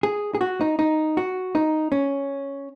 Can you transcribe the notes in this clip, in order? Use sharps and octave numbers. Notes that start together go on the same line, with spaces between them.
G#4
G#4
F#4
D#4
D#4
F#4
D#4
C#4